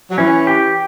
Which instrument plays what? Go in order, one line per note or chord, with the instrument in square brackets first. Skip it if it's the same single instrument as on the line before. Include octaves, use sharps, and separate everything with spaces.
[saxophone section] F#3
[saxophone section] E3 [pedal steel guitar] C#4
[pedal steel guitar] G4